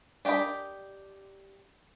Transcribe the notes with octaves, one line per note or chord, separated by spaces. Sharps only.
D4 G4 A#4 D#5 B5